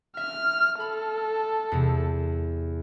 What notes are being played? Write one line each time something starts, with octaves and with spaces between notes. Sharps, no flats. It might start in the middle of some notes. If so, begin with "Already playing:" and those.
E5 F6
A4 B5
E2 C3